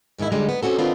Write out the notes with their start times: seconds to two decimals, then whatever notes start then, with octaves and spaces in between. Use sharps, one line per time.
0.18 D#2 G#2 D#3 G#3 E4
0.32 D3 F3 G3 G#3 B3 D#4
0.49 B3
0.63 C4 C#4 F#4 A4
0.78 D#3 B3 C4 D4 F4 D#5